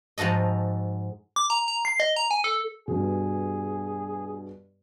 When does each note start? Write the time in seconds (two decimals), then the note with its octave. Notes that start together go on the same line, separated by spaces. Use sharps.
0.18 G#2 F3 F#4 A4 D#5
1.36 D6
1.50 A#5
1.68 A#5
1.85 C7
2.00 D#5
2.16 A#5
2.31 G#5
2.44 A4
2.88 G2 B2 G#4